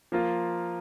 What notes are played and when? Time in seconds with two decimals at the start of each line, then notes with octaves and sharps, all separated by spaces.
0.12 F3 A#3 F4